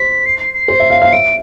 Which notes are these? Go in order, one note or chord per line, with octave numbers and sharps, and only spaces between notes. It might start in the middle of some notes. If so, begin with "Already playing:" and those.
Already playing: C5 B6
C7
C7
C7
C5
E5
F5
F5
E5 D7